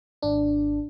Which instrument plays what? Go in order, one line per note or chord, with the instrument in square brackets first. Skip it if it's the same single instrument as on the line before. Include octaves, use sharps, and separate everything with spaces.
[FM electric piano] G#1 D4